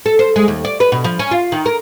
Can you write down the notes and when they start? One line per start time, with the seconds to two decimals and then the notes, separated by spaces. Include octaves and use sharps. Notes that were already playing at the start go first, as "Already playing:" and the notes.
0.06 A4
0.19 C5
0.36 G#3
0.48 D#2
0.65 D5
0.80 B4
0.92 B2
1.04 F3
1.19 C#4
1.31 F4
1.52 D#3
1.66 A#4